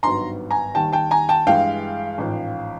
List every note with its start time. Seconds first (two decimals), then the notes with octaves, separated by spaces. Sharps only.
0.03 G#1 G2 D#3 F#3 B3 A#5 C6
0.51 G#5 A#5
0.75 D#2 D#3 G3 G5 A5
0.93 G5 A5
1.11 G#5 A#5
1.29 G5 A5
1.47 G2 E3 G#3 F5 G5
2.18 A1 G#2 F3